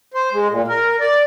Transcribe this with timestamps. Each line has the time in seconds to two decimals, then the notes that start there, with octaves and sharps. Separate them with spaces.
0.14 C5
0.32 G#3
0.50 A#2
0.68 A#4
1.00 D5